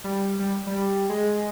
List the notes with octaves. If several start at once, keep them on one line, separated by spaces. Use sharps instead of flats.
G3
G3
G3
G#3